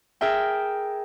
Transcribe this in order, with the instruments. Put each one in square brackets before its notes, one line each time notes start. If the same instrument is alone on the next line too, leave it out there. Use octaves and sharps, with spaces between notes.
[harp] G#4 A#4 E5 G5